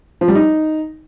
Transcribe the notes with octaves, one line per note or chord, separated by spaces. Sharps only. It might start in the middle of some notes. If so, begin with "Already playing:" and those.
F3
G3
D#4